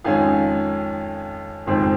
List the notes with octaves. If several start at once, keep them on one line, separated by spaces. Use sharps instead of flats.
F2 D#3 G#3 C#4 F5 G#5
F#1 F2 D#3 G#3 C4